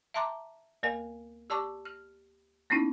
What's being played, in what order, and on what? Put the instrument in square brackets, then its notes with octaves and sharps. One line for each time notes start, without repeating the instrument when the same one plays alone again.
[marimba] E5 A5 A#5 C6 D6
D2 A#3 A#4 F5 G#5
G4 D5 A5 C#6 D6
F6
A#3 B3 C#4 D#4 E4